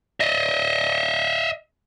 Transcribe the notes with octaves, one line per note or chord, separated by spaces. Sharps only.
D#5 E5